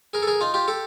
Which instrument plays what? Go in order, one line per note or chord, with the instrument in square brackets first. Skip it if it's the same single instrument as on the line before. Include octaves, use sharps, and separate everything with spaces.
[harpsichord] G#4 A#4
A4
G#4 A#4
D#4 F4
F4 G4
G4 A4